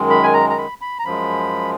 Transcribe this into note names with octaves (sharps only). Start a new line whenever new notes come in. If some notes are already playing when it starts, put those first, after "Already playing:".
Already playing: F#2 D#3 G#3
B5
G#5
A#5
A#5
B5
B5
A#5
F#2 F3 G#3 B5